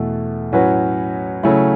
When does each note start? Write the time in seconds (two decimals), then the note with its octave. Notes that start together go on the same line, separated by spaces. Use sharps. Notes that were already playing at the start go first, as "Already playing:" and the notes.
Already playing: E2 B2 A3
0.53 A2 F#3 C#4 F#4 B4
1.43 C#3 F#3 A3 C#4 E4